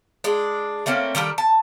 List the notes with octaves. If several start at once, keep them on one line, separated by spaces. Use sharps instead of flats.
G#3 D4
A3 A#3 C4 C#4
D#3 G3 A4 A#4
A5